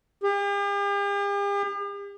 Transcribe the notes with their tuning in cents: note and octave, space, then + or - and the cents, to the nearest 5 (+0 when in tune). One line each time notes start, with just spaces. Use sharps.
G4 +45